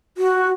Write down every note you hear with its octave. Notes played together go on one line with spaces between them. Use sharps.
F#4